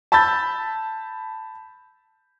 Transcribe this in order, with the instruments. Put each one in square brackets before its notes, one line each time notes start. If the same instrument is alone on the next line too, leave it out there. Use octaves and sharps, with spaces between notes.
[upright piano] A5 B5 E6 G6 A6